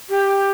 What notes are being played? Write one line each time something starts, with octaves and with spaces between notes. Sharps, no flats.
G4